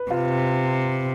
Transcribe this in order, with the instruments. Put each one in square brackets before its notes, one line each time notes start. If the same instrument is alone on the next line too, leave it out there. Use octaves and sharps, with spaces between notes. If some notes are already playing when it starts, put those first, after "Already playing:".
Already playing: [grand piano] B4
[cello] C3 [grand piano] F4